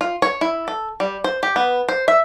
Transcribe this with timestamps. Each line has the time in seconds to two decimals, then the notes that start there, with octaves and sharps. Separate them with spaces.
0.01 F4
0.22 C#5
0.41 E4
0.68 A4
1.00 G3
1.24 C5
1.43 G4
1.56 B3
1.89 C5
2.08 E5